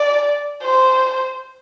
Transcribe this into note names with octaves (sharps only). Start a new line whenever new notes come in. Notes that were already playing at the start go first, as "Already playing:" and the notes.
Already playing: D5
C5